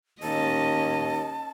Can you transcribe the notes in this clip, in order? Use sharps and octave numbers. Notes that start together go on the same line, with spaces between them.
D#2 C#4 D#5 A5